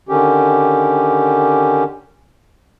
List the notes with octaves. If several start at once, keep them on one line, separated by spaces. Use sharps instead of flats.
D3 D#3 C#4 G4